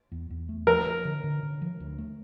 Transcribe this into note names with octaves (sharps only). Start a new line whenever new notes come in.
E2
E2
A3
F3 A#4
F3
D3
D3
D3
F3
D2
A3